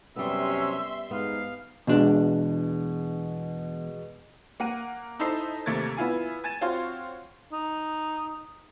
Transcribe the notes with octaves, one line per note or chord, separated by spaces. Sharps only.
F#2 C3 G3 B3 C#4 E5 C6 E6
G#2 B3 F5
E2 B2 G#3 D4
A#3 F#5 D#7
D#4 E4 A4 C5 D#5 C7
D#2 C3 A3 A#3 G#6 A6
B3 E4 F4 G#5
G#5 G#6 A6 D#7 E7
C4 F4 F#4 C#5 F5 C6
D#4